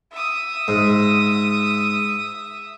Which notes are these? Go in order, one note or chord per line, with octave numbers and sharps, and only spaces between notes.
E5 D#6
G#2